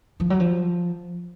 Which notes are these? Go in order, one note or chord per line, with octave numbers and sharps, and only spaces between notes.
F3
F#3
F3